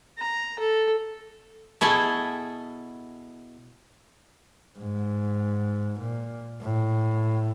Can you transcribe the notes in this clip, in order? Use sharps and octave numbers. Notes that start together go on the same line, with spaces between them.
A#5
A4
B2 E4 G#4 A4
G#2
A#2
A2